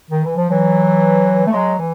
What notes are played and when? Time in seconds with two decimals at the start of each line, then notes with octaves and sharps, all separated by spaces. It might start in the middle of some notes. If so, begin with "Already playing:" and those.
0.11 D#3
0.25 E3
0.37 F3
0.50 E3 F#3
1.47 A3
1.53 F#3 G#3
1.79 E3